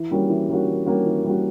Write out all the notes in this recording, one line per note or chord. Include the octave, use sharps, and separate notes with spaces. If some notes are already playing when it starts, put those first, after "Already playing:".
Already playing: E3
G3 A#3 C#4 F#4
E3
G3 A#3 C#4 F#4
E3
G3 A#3 C#4 F#4
E3
G3 A#3 C#4 F#4